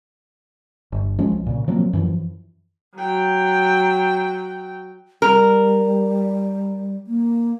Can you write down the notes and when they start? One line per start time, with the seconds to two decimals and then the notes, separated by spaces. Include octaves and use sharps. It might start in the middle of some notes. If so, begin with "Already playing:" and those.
0.92 G1
1.19 F3 G#3 C#4
1.32 B1
1.46 A#2 C#3
1.68 F3 F#3 A#3 C4
1.93 F#2 E3 F3
2.95 F#3 G5
5.22 G3 A#4
7.07 A#3